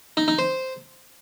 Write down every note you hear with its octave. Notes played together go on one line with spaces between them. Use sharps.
D#4
D#4
C5